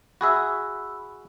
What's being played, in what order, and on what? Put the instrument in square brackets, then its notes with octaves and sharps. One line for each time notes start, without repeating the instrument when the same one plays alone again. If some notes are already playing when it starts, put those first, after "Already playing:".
[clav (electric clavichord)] F#4 G#4 E5 [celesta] B5 E6